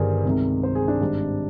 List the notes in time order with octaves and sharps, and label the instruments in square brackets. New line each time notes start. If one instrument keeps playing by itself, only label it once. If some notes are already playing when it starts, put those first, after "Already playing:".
Already playing: [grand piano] G1 G2 D#3 G3 G#4 A#4 C5 D5
C2 C3 D#3 G#3
C5
G#4
D4
G#1 G#2 G3